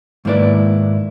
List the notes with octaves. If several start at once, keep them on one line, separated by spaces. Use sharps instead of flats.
G#2 D#3 A#3 E4 B4 D5